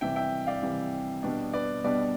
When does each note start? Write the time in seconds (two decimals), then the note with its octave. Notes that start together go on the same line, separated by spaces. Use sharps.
0.01 C3 E3 G3 E5 G5
0.16 E5 G5
0.47 D5 F5
0.63 C3 E3 G3
1.23 B2 G3 B3 D4
1.53 B4 D5
1.84 B2 G3 B3 D4 B4 D5